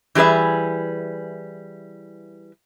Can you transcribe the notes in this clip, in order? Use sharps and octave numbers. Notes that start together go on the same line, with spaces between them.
E3 G3 G#4 B4 E5